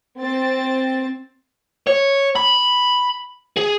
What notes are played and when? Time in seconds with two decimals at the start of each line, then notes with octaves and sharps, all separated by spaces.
0.18 C4 A6
1.87 C#5
2.35 B5
3.57 G#4